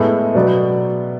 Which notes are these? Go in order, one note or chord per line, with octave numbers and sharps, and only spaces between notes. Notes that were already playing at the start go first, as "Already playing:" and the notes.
Already playing: A2 G#3 B3 A4
B2 F#3 B3 D5